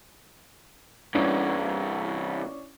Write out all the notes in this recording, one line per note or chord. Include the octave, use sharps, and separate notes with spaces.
C2 G2 C#4 D4 E4